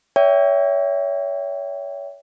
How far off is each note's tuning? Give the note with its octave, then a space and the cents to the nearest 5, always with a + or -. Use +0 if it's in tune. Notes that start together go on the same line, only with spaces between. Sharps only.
C#5 +30 E5 +0 G5 +0